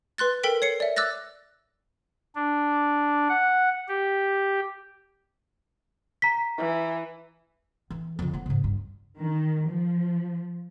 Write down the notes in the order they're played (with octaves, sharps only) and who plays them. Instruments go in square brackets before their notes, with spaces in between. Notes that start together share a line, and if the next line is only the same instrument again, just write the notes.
[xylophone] B4 C6 F#6 A6
A4 A#4 G5 B6 D7
C#5 C7 C#7
D5 E5
D6 E6 F#6 A6 A#6
[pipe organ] D4
F#5
G4
[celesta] A#5 B6
[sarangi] E3
[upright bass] E3
F2 D3
B3 C4
G#2 C#3
G2
[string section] D#3
F3